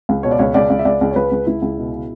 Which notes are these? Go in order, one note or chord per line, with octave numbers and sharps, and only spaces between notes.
C#2
B2 C#5
D5
C#2 C#5
C#2 D5
C#2
E5
C#2 D5
C#2
C#5
C#2 B4
C#2
C#2 E4
C#2
B2
B2